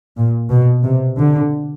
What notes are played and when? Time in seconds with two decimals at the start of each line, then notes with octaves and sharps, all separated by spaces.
0.18 A#2
0.51 B2
0.85 C3
1.19 D3